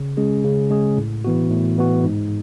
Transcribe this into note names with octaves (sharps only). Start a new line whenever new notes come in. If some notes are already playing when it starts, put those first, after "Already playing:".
Already playing: C#3
G#3 C#4 G#4
C#3
G#3 C#4 G#4
A2
E3 B3 F#4
A2
E3 B3 F#4
G#2